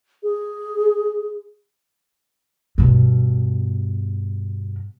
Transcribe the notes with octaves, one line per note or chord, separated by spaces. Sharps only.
G#4
G2 B2